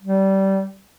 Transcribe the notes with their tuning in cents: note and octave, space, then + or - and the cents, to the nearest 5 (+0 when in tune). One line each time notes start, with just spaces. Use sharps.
G3 -20